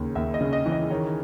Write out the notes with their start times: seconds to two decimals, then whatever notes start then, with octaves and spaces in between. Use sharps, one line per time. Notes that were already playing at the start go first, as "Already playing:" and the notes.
Already playing: D#2 C#3
0.15 D#2 E5
0.34 D#5
0.41 C#3
0.53 D#5
0.66 E3
0.72 D#5
0.90 D#3 C#5